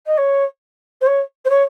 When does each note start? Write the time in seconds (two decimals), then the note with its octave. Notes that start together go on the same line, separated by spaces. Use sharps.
0.06 D#5
0.17 C#5
1.01 C5
1.06 C#5
1.45 C5
1.49 C#5